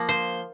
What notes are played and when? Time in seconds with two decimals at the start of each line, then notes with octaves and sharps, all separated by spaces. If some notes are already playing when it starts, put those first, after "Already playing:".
Already playing: F3 A#3
0.09 C5